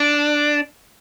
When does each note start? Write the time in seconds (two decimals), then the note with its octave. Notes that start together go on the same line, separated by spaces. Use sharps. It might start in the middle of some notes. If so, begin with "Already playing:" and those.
Already playing: D4